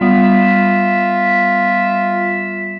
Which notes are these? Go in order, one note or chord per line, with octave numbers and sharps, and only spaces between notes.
G3 B3 F4 E5